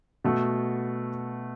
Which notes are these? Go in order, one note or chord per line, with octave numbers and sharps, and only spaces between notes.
B2 A3 F#4